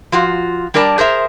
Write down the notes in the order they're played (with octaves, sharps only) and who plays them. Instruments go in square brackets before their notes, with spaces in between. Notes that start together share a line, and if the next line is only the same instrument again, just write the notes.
[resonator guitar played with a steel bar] F3 F4 F#4
G3 D4 A#4 D5 A5
G#4 A#4 C5 E5